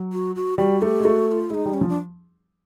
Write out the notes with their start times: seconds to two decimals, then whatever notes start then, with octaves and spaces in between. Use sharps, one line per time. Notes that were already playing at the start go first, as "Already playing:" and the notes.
Already playing: F#3
0.13 F#4
0.36 F#4
0.58 G3 F#4
0.82 A3 G4
1.00 G#3
1.04 A3 F#4
1.28 F#4
1.32 F4
1.50 G#3 D#4 E4
1.66 G3
1.74 C#4
1.81 F3
1.89 D4